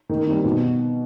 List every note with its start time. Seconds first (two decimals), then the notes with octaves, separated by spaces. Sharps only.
0.09 D#3
0.27 G3 C4
0.44 B2